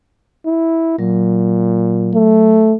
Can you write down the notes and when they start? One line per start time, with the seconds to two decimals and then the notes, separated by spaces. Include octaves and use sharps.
0.45 E4
0.99 A#2 F#3
2.15 A3